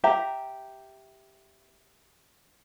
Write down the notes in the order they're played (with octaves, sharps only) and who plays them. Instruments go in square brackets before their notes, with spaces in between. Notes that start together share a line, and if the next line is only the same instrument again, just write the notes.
[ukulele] G4 E5 A#5